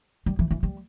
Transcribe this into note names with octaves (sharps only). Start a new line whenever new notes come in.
G3
E3
E3
G3